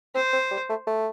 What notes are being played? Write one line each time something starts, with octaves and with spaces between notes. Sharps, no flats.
C4 C5
C4
G3
A3
A3